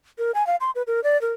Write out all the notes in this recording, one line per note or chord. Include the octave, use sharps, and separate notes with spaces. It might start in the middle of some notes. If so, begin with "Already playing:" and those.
A#4
G#5
F5
C6
B4
A#4
D5
A#4